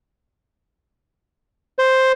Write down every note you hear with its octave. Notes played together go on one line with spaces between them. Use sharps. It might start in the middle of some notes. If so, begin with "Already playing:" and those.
C5